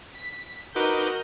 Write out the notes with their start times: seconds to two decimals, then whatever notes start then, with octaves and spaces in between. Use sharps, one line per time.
0.15 B6
0.76 D#4 F#4 A#4 B4 D#5 A#5 D6 G6